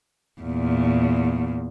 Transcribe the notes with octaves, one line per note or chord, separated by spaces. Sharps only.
E2 A#2